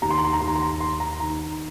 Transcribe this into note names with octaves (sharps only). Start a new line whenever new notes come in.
D#2 A#5
C6
A#5
C6
A#5
D#2 C6
A#5
C6
A#5
D#3 C6
A#5
D#3 A#5